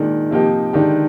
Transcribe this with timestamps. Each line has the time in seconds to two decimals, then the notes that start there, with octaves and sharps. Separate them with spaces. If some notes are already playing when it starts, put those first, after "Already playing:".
Already playing: A#2 D#3 G#3 D4
0.31 C3 F3 A#3 D#4 G4
0.73 D3 D#3 G#3 D4 G4